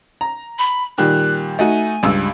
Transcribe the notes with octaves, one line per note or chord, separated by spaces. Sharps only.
A#5
B5
A#2 D#3 G3 F#6
A3 D#4 F#4 G#5
C#2 G2 E6